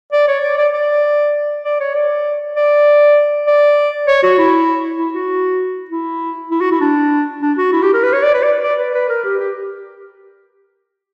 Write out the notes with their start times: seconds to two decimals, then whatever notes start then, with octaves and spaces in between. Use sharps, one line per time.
0.12 D5
0.28 C#5
0.43 D5
0.58 D5
0.73 D5
1.65 D5
1.80 C#5
1.95 D5
2.56 D5
3.47 D5
4.07 C#5
4.23 F#4
4.38 E4
4.98 E4
5.14 F#4
5.90 E4
6.51 E4
6.61 F#4
6.71 E4
6.81 D4
7.42 D4
7.58 F#4
7.73 E4
7.83 G4
7.93 A#4
8.03 B4
8.13 C#5
8.23 D5
8.34 B4
8.43 D5
8.63 D5
8.79 B4
8.95 B4
9.09 A#4
9.24 G4
9.39 G4